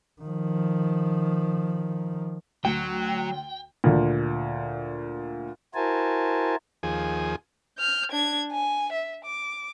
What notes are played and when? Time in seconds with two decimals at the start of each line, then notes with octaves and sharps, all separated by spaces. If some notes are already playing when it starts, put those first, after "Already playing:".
0.22 D#3 F3
2.65 D2 F#3 G5
3.84 D2 A#2
5.75 E4 F#4 A#4 C5 G#5 A5
6.83 D#2 F3 G#4 G#5
7.78 F6 G6
8.11 D4 G#6
8.52 G#5
8.93 E5
9.25 D6